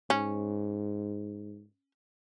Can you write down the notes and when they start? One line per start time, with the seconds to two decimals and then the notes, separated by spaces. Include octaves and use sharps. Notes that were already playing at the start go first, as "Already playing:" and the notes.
0.10 G#2 C#4